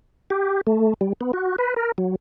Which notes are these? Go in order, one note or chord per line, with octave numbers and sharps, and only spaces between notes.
G4
A3
G3
B3
F#4
B4
A#4
F#3